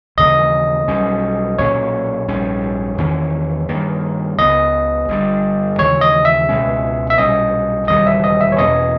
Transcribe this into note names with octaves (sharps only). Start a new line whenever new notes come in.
D#2 C#3 E3 A#3 D#5
B1 B2 G3 C#4
B1 A#2 A#3 C#4 C#5
A#1 G#2 G3 C#4
E2 D#3 A#3 C#4
G2 D#3 A#3
C#2 C#3 G#3 B3 D#5
G1 G2 G3
D#2 C#3 E3 G#3 C#5
D#5
E5
C#2 B2 G#3 C#4
E5
B1 A#2 G3 C#4 D#5
E1 D#2 C#3 G3 D#5
E5
D#5
E5
C#5
E2 B2 A#3 C#4 D#5